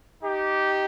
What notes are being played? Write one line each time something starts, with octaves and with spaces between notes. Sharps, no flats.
D#4 G4